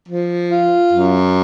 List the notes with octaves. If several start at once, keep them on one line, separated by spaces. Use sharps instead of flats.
F3
F4
F#2